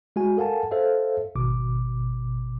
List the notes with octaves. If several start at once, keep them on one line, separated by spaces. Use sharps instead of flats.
G#3 F#4 G#5
A4 A#4 F5 F#5 G#5 A5
A4 C5 E5 F5
G#1 B2 D6